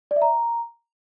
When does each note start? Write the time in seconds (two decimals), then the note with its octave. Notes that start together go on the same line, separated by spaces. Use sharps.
0.11 D5
0.16 E5
0.22 A#5